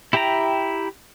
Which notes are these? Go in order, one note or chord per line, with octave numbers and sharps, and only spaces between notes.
E4 G4 E5 G5 A#5